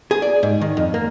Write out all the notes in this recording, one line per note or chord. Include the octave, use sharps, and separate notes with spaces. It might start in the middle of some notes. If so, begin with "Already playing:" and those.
G#4
D5
G#2
D#3
F2
A#3